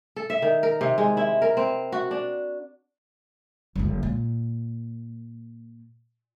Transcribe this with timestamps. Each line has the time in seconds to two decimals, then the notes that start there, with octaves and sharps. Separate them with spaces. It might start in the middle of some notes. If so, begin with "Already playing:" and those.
0.16 A4
0.30 E5
0.42 D#3
0.63 A#4
0.81 C3
0.98 G#3
1.17 E4
1.42 A#4
1.57 C4
1.92 F#4
2.11 D4
3.76 F#1 D2
4.03 A#2